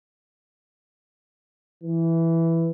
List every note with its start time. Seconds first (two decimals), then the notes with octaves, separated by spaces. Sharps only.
1.83 E3